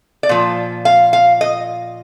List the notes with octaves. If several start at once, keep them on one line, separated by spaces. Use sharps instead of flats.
D5
A#2 F3
F5
F5
D#5